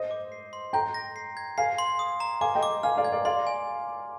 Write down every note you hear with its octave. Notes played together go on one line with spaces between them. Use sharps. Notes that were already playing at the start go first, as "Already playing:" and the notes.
Already playing: C5 D#5
D6
C7
C6
G5 A#5 G6
A#6
C7
G#6
F5 G#5 C7
C6
D#6
A#5
F5 G#5 D6
D#5 G5
D6
F5 G#5 F6
D5 F5
G#6
A#4 D5
D5 F5 C6
G#5